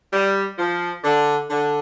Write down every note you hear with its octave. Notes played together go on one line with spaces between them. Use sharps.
G3
F3
D3
D3